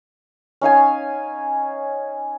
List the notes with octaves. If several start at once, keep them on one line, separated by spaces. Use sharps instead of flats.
C#4 D#4 F5 G#5